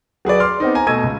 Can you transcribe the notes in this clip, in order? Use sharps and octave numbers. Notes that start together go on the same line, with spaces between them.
F#3 G#4 B4 D5
C6 D6 F6
B3 C4 D#4
G#5 A#5
B2 A3 D#5 E6 G#6 D#7
C#2